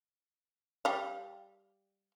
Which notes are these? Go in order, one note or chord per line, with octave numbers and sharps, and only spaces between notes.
G3 F5